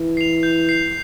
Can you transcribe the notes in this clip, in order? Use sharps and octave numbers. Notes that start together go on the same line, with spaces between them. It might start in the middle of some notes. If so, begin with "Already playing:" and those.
Already playing: E3
C7 F7
G6
C7 F7